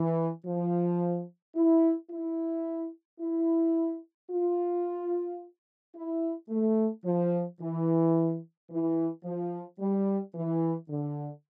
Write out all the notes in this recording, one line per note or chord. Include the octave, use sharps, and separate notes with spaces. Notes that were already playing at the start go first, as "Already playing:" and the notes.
Already playing: E3
F3
E4
E4
E4
F4
E4
A3
F3
E3
E3
F3
G3
E3
D3